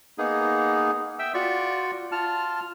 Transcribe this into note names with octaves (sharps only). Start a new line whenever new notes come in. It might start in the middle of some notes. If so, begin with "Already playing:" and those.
A#3 B3 D#4 G#4
E5 G5 E6
F4 F#4 D5 C#6
F4 A5 F6